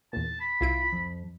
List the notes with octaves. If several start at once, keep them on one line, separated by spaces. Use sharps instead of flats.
E2 A#2 A5
B5
C2 E4 F4 D7
F2